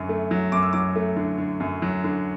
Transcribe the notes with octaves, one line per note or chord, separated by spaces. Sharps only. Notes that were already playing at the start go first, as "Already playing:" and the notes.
Already playing: F#2 D3 F#3
A3
F#3
F#2 D6
E6
F#3 D6
A3
D3
D3
F#2
F#3
D3